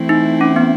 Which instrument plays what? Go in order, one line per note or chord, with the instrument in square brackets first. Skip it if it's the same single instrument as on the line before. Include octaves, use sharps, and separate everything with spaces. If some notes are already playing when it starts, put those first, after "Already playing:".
Already playing: [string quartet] E3 A3 C4 E4
[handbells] D#4
C#4
B3